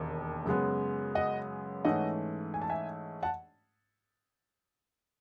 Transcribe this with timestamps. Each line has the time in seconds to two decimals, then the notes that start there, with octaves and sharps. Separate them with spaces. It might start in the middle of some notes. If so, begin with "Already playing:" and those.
Already playing: E1 D#2 D#3
0.46 F#2 C#3 G#3 B3
1.15 D#5 F#5
1.85 G#2 E3 A3 C#4 D#5 F#5
2.54 G#5
2.62 A5
2.69 E5 G#5
3.23 F#5 A5